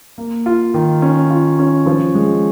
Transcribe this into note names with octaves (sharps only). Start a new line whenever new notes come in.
A#3
F4
D#3
C#4
F4
C#4
F3
G#3